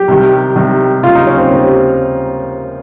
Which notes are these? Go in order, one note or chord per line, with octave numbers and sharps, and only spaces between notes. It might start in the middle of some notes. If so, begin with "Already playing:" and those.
Already playing: G4
C2 C3 D#3 G3
C2 C3 D#3 G3
D#2 C#3 G3 F4
D#4
C#4
C4
D#2 C#3 G3